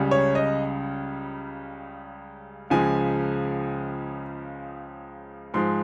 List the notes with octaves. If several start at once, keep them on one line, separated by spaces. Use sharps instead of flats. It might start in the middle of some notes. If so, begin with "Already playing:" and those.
Already playing: C#2 C#3 G3
C#5
D#5
C#2 C#3 F3 G#3 G#5
G#2 F3 G#3 C6